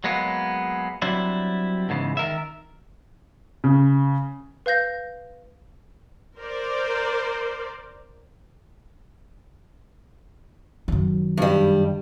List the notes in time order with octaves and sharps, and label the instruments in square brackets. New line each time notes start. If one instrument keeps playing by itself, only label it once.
[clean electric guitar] F#3 G#3 A#3 B3
F#3 G3 C4 D4 E4
E2 G#2 C#3 E3
D#3 A#4 E5
[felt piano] C#3
[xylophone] B4 F5 G6 A#6
[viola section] A#4 C5 D5
[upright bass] F#2 D#3
[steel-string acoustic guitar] G2 G3